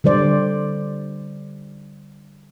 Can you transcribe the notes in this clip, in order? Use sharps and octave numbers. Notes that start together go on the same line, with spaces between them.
D3 G3 C5 D5